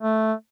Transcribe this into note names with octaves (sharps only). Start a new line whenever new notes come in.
A3